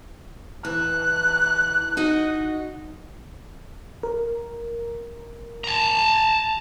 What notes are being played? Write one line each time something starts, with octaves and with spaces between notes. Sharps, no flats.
E3 F#6
D#4 F#4 D#5
A#4
A5 A#5